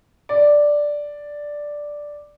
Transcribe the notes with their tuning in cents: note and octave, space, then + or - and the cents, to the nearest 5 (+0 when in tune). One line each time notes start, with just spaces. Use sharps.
D5 +0